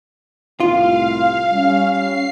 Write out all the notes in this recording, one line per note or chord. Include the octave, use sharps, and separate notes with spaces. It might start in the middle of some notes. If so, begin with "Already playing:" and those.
C2 A2 F4 F5
G3 C#4
C7